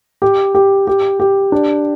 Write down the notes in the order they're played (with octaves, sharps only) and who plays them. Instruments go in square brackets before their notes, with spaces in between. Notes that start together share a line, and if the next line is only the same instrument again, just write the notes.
[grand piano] G4
G4
G4
G4
D4